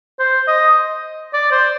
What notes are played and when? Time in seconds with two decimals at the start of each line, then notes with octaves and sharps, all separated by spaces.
0.19 C5
0.48 D#5
1.34 D5
1.51 C5